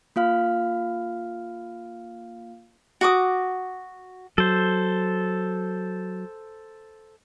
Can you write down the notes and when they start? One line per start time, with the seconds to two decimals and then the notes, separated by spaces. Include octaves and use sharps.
0.16 A#3 F4 F5 F6
3.01 F#4 D6 D#6
4.38 F#3 A4 C5